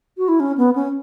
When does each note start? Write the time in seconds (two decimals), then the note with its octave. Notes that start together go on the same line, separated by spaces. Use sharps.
0.18 F#4
0.28 E4
0.40 C#4
0.58 B3
0.76 C#4